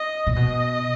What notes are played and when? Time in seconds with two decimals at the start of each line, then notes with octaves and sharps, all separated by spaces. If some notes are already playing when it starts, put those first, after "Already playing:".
Already playing: D#5
0.27 A#2
0.36 B2 D#5